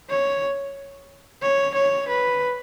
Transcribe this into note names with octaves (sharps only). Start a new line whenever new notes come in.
C#5
C#5
C#5
B4